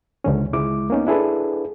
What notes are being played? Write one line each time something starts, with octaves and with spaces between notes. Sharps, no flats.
C#2 D3 C#4
C#2 G#3 E4 D6
A#3 B3 C#4 D#4
D4 E4 G#4 A4 B4